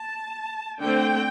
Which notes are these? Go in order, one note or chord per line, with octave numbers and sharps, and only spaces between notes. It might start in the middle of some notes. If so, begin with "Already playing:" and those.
Already playing: A5
D3 A3 C4 G5